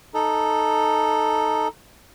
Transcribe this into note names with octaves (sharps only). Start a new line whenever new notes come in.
D#4 A4